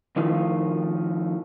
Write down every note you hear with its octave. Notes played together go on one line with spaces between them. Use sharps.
D#3 F3 A3 D#4 F4